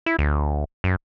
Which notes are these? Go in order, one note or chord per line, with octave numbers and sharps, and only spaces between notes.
E4
D2
F#2